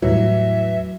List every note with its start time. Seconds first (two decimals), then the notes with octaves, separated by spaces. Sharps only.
0.02 E2 A2 E3 F#3 G3 E5